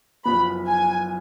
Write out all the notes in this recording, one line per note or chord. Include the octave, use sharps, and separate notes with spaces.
F#1 F#2 F3 B3 B5
G#5